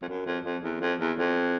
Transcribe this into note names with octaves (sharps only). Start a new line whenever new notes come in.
F2
F#2
F2
F2
E2
F2
E2
F2